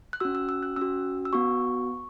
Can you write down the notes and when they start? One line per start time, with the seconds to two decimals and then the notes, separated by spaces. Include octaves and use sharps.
0.13 F#6
0.20 C#4 F#4 E6
0.35 E6
0.49 E6
0.63 F#6
0.76 C#4 F#4 E6
1.25 E6
1.33 B3 F#4 C#6